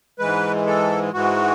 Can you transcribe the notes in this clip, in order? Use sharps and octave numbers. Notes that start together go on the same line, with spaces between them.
G#2 E3 G#3 B4
A4
G#2 E3 G#3 F#4